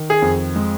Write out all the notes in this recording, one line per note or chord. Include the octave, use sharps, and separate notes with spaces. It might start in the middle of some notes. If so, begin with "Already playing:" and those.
Already playing: D#3
G#4
F2
G#3